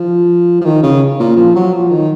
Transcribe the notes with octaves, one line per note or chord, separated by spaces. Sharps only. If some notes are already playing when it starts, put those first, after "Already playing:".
Already playing: F3
F3
D#3
C#3
A#2
F3
F#3
F3
D#3